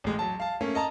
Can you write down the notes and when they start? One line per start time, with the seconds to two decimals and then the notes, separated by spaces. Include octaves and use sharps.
0.04 A1 G#3
0.19 F#3 A5
0.40 F5 A5
0.61 A3 A#3 C#4
0.75 D#5 A5 A#5